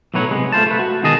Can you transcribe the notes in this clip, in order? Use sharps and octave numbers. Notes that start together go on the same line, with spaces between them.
B1 A2 F#3 B4 C#5
C3 G#3 B3
A3 F4 C5 A5
A3 B4
F#4
B2 D#3 G#3 G#4 D#5 A5